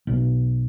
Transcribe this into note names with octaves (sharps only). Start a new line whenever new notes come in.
B1